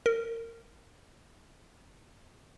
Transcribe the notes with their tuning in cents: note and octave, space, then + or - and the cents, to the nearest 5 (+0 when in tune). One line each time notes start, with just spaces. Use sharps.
A#4 -25